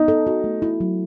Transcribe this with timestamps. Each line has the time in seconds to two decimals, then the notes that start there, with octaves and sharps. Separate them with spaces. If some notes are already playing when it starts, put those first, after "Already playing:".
Already playing: B3 D#4
0.08 A4
0.27 F#4
0.44 A3
0.62 E4
0.80 F#3